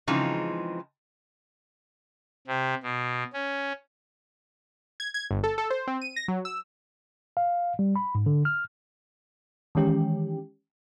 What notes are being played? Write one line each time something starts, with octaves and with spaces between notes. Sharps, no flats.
C#3 E3 F3 G#3 C4 D#4
C3
B2
C#4
G#6
G#6
G1
A4
A4
C5
C4
D#7
A#6
F#3
E6
F5
G3
B5
G#2
D3
F6
D#3 E3 G#3 C#4 G4